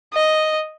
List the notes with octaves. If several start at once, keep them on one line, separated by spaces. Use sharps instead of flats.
D#5